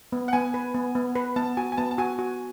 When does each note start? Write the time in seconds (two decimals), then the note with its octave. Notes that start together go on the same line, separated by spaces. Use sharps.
0.12 B3
0.28 F#5
0.33 B3 G#5
0.54 B4
0.74 B3
0.95 B3
1.15 B4
1.36 B3 A5
1.57 F#4 G#5
1.72 G#5
1.77 B3 A5
1.91 A5
1.98 F#4 G#5
2.19 F#4